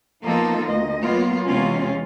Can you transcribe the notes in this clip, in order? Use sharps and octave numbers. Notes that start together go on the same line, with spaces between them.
F3 A#3 B3 D#4 F4 A4
D2 D#5
F#3 A#3 B3 F4
E2 C3 G#3 C4 C#4 F4